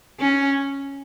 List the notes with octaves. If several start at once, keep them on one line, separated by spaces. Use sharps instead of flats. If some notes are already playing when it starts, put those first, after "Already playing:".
C#4